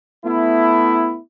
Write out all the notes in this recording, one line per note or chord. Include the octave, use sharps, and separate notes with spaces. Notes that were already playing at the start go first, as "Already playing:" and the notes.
A3 B3 E4